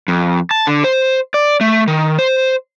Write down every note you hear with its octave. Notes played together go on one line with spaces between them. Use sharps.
F2
A5
D3
C5
D5
A3
D#3
C5